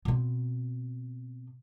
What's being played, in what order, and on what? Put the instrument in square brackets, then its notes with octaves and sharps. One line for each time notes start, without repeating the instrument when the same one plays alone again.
[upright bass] B2 C4